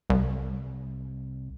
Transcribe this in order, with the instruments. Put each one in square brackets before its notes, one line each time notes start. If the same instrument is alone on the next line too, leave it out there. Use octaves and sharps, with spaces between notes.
[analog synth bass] C2